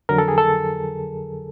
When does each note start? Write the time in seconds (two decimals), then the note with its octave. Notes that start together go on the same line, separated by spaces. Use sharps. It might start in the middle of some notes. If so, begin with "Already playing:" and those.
0.09 F2 D3 F#3 A#4
0.18 A4
0.28 G#4
0.38 A4